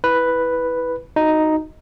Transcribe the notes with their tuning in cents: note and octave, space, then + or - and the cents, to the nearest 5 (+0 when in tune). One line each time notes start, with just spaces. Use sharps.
E4 -10 B4 +0
D#4 +0 F#4 -5